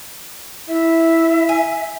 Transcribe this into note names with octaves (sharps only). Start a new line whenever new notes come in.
E4 E5
G#5